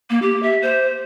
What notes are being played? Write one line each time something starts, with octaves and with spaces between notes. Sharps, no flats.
A#3
G4
E5
C5